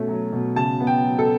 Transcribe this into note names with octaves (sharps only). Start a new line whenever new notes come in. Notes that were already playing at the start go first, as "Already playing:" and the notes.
Already playing: B2 A3 C#4
F#3
B2
C#3 A5
B3
G5
F#3
A4